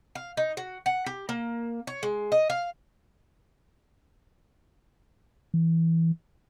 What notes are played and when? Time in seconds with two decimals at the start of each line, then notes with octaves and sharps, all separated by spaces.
0.15 F5
0.37 D#4
0.57 F#4
0.86 F#5
1.06 G4
1.29 A#3
1.87 C#5
2.03 G#3
2.32 D#5
2.50 F5
5.54 E3